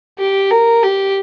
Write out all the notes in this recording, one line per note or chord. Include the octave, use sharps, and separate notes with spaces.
G4
A#4
G4